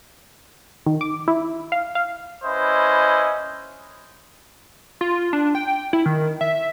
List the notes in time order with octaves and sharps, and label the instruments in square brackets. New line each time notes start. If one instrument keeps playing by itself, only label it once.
[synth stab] D#3
D6
E4
F5
F5
[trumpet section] C#4 E4 B4 C5 D#5
[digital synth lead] F4
D4
G5
E4
D#3
E5